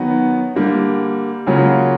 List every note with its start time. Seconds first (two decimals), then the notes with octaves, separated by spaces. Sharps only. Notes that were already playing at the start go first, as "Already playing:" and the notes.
Already playing: D#3 F#3 B3
0.55 D3 G3 A#3
1.46 C#3 F#3 A#3 C#4 F4